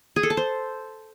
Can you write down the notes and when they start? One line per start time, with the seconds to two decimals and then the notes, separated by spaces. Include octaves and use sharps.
0.16 G#4
0.23 A4
0.30 A5
0.37 C5